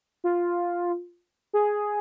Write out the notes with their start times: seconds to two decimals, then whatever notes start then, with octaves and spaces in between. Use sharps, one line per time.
0.24 F4
1.53 G#4